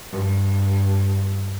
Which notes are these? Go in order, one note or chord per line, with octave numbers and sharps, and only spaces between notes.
G2